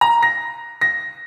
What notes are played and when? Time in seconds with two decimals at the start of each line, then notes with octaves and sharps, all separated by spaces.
0.01 A#5
0.23 A#6
0.81 A#6